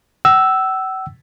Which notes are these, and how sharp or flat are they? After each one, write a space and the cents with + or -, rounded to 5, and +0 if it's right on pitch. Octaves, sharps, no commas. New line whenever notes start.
F#5 +45 E6 +0